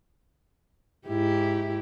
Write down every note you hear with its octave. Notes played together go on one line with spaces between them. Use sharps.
G#2 E4 G4